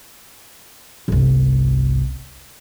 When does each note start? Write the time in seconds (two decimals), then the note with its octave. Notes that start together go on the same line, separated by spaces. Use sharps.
1.08 G1 C2